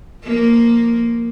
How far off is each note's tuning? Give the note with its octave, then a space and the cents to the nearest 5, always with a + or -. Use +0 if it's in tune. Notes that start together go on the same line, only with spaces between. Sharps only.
F3 +0 A#3 +0